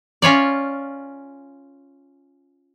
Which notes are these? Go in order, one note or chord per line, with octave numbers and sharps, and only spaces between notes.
C#4 F4 C#5 D5